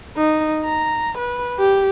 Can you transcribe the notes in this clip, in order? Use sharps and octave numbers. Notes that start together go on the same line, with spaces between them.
D#4
A#5
B4
G4